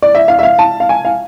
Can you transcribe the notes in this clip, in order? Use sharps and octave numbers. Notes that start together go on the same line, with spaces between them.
D5
E5
F5
E5
F5
A5
F5
G#5
F5